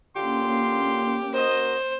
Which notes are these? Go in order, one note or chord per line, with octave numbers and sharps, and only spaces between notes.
D3 A#3 C#4 F4 G4 C6
F#4 A#4 C5 D#5